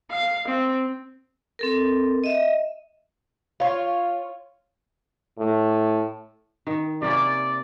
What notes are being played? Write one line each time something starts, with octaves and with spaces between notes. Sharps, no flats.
F5
C4
C4 A4 A#4
D#5 E5
F4 C#5
A2
D#3
C3 A#3 C#4 D5